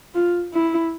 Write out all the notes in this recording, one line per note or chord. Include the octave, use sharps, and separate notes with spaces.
F4
E4